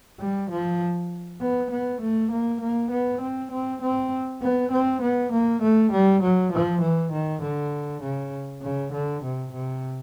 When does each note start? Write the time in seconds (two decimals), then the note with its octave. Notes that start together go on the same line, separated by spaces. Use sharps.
0.20 G3
0.50 F3
1.41 B3
1.71 B3
2.01 A3
2.31 A#3
2.61 A#3
2.91 B3
3.21 C4
3.51 C4
3.82 C4
4.42 B3
4.71 C4
5.01 B3
5.32 A#3
5.62 A3
5.92 G3
6.22 F#3
6.52 F3
6.81 E3
7.12 D#3
7.42 D3
8.02 C#3
8.62 C#3
8.93 D3
9.23 C3
9.52 C3